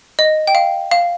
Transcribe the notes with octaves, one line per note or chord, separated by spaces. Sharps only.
D#5
G5
F5
F5